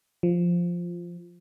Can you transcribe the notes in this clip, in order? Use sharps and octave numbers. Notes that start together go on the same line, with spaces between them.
F3